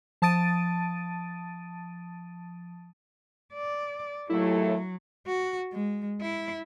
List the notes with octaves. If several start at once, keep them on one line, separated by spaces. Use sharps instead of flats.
F3 A5 D#6 A6 D7 D#7
D5
D#2 A2 F#3 A3 E4
F#4
G#3
E4